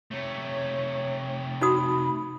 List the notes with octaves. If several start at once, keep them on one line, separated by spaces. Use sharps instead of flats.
C3 A3 C#5
D#4 F#4 B5 D#6